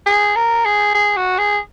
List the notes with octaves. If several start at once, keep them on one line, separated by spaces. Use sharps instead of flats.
G#4
A#4
G#4
G#4
F#4
G#4